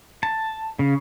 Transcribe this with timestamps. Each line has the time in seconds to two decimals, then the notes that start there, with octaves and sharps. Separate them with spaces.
0.23 A5
0.79 C#3